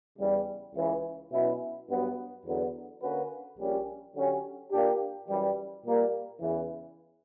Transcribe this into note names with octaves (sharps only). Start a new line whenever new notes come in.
E2 C#3 G3
C#2 C#3 E3
B2 F#3 C#4 E4
G2 F#3 B3 F#4
E2 D3 F#3 B3
D3 A#3 C#4 F#4 B4
A#1 A#2 G3 C#4
D3 F#3 C#4 G4
A#2 A#3 D4 G4
F#2 E3 G3
A#2 G3 A#3
E2 C#3 E3